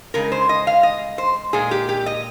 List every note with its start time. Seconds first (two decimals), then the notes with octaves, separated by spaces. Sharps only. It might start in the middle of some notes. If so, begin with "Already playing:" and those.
0.14 C#3 G#3 A#4
0.32 C5
0.49 D#5
0.67 F5
0.83 D#5
1.18 C5
1.53 A#2 G#3 G#4
1.71 G4
1.89 G4
2.06 D#5